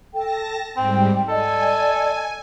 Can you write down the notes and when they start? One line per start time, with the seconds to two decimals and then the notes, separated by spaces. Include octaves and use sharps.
0.14 A4 G5 A5 A#6
0.77 G#2 G3 C4 G5
1.29 A4 D5 D#5 G#5